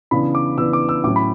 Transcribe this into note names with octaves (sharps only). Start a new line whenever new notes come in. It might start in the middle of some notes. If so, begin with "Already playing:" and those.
C#3 E3 B3 D4 B5
D6
C#3 E3 B3 D4 E6
D6
E6
A2 F#3 C#4 D6
B5